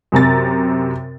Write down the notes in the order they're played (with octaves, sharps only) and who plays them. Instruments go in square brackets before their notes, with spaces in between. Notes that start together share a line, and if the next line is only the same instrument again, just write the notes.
[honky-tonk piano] F#2 C3 A#5 A6